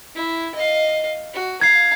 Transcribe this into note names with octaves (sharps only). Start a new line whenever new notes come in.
E4
D#5 F5
F#4
F5 A#5 G#6 C7